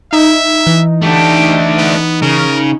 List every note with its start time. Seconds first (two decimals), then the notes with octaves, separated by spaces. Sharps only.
0.13 D#4 E5
0.67 E3
1.03 A3 D4 G4
1.78 B3
2.22 C#3 A#4